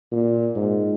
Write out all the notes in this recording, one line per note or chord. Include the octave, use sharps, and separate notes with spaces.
A#2
G#2